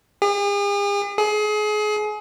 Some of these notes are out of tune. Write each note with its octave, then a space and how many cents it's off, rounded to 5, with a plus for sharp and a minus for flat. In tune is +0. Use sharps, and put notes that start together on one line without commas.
G#4 -45
G#4 +30